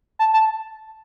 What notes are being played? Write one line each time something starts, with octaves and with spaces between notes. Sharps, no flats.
A5
A5